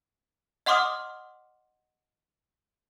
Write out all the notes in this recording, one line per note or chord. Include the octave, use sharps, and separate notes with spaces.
D#5 F#5 C6 D6 D#6 F6